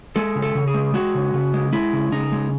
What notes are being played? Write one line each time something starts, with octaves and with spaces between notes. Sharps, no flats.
G#3 A4
C#3
A4
C#3
G#4
G#3
G#3 F#4
C#3
C#3
G#3
G#3 E4
C#3
C#3 D#4
G#3